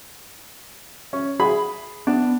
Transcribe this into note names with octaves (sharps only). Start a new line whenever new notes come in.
C#4
G#4 B5
B3 D4